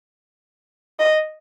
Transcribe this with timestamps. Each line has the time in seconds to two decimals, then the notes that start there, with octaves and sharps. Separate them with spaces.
0.99 D#5